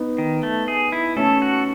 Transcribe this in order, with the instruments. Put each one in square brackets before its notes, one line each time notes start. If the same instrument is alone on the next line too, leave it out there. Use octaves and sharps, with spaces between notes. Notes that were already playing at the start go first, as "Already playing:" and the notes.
Already playing: [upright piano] B3 D#4
[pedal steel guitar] D#3
A3
G#4
E4
[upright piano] A3 C#4 [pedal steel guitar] A4
[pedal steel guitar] F#4